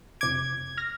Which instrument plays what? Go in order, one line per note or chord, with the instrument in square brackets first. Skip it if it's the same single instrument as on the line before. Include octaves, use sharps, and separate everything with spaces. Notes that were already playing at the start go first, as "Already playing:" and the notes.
[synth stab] F2 C3 D6 [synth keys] G#6
[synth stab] F6 A#6